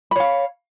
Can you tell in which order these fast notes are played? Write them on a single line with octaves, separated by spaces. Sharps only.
B5 C#5 F5